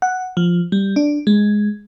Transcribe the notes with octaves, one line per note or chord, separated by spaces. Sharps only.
F#5
F3
G3
D4
G#3